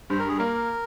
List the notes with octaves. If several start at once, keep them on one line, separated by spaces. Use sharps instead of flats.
G2 C5
A#4
G#4
A#3 A#4